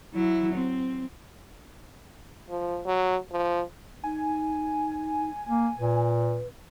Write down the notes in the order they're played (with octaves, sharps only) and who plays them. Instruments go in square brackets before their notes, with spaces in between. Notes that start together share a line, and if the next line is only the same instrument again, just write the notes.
[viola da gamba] F#3 E4
C4
[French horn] F3
F#3
F3
[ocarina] D#4 [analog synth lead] G#5
[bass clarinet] A#3
[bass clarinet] A#2 [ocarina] B4